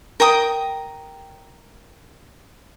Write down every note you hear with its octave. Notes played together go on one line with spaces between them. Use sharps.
A#4 G5 D#6